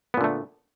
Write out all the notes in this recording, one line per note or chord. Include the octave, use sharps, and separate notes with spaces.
A#2 D3 A3 B3